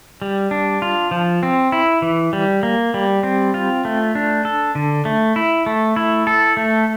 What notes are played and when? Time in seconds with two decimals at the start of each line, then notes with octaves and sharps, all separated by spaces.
0.22 G3
0.51 D4
0.82 F4
1.11 F3
1.43 C4
1.72 E4
2.02 E3
2.33 G3
2.63 A#3
2.94 G3
3.23 C4
3.54 F4
3.85 A3
4.15 D4
4.45 A4
4.75 D3
5.05 A3
5.36 E4
5.66 A3
5.96 E4
6.27 A4
6.57 A3